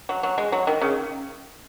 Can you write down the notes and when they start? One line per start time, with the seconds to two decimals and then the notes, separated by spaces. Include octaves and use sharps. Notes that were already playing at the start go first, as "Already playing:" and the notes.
0.09 F#3
0.23 F#3
0.38 G#3
0.52 F#3
0.67 D#3
0.81 C#3